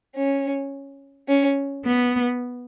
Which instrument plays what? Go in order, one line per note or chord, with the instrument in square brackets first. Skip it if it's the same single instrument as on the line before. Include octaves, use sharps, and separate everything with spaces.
[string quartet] C#4
C#4
B3